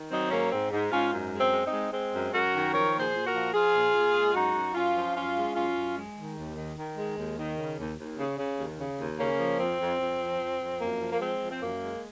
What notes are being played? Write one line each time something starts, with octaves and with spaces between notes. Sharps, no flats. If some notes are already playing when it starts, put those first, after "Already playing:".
Already playing: D#3
F#3 C4 D#4
G#2 A#3 C#4
G#2 C4
G#2
G#2 C#4 F4
F#2
G#3
C4
G#3
C4 D#4
G#3
G#3 C4
F#2
F#2 F#4 A#4
D#3
F3 A#4 C#5
A#2
G#4 C5
A#2
F#4 A#4
F3
F3 F4 G#4
A#2
A#2
G#3
F#2 D#4 F#4
F#2
F#2 C#4 F4
F3
F#2 C#4 F4
G#3
F#2 C#4 F4
F#2
G#3
D#3
D#2
D#3
D#3
G#3
D#2
D#3
C#3
D#2
D#2
C#3
C#3
D#2
C#3
D#2
C#3 A#3 C#4
F3
F2 C4
F2
F2
F3
F2
F2
F#2 A#3
F3
A#3
G#3 C4
F3
C4
F#2 A#3
G#3